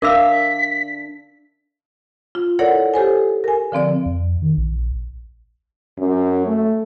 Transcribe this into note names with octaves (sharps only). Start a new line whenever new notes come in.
D4 A#4 E5 F5 D6 E6 B6
F4
E4 A4 A#4 C#5 D5 F#5
G4 A4 C5 G#5
A#4 G#5
D3 F3 C4 D5
F2
D#3
A#1
F#2
A3